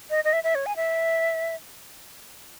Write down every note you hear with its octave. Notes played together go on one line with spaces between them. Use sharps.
D#5
D#5
E5
E5
C#5
G#5
E5